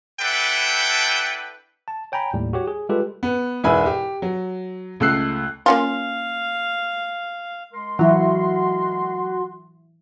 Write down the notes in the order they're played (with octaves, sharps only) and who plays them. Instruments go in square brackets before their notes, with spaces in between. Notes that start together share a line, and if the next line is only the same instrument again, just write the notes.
[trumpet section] D4 E4 A4 B4 F#5 G5
[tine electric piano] A5
C#5 G5 G#5 A#5 B5
D#2 A2 G3
F#4 G4 C#5
G#4
G3 G#3 F4 G4 A4 B4
[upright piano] B3
E1 G#2 E4 B4 G#5 B5
G4
F#3
C#2 A3 E6 F#6 C7
[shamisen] A#3 C#4 F4 [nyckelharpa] F5
[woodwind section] G#3 A#4 C6
[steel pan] E3 E4 [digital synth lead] F#3 [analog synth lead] F#4